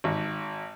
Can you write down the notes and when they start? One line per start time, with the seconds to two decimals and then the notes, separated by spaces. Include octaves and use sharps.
0.04 G#1